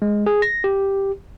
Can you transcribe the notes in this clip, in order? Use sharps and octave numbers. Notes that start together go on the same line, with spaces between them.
G#3
G#4
A#6
G4